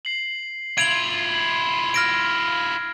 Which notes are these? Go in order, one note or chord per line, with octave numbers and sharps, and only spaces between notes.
C7 F#7
E4 F4 G#6 D7 F7 F#7
F6 A#6 D7